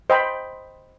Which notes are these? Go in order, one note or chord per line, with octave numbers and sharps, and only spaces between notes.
C5 D#5 G5 B5